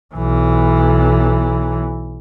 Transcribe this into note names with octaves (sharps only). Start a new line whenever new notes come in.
B1 E3